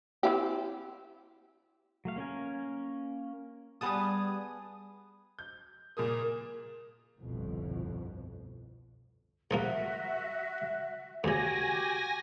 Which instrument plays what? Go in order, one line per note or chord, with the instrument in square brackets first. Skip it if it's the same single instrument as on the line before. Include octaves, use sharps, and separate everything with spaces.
[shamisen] C4 E4 G4
[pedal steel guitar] F#3 A3 F5
A#3 C#4 A#4 G#5
[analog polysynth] G3 D#6 [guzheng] B3 G#4 A5
[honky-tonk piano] G6
[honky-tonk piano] A#2 G#4 D#6 [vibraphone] A#4
[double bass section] G1 C2 F2 B2
[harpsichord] A#1 F3 A#3 [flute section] F#4 E5
[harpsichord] D2 C#3 [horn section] F#4 G4 [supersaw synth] G#5 A#6